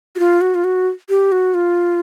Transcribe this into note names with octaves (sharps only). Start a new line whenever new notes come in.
F#4
F4
F#4
F4
F#4
G4
F#4
F4